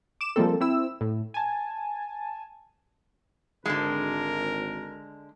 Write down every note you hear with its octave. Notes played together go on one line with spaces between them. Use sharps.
D6 E7
F3 G3 G#3 A#3 C4 A4
C4 E4 E6
A2
G#5 A5
G#1 D3 G#3 A#4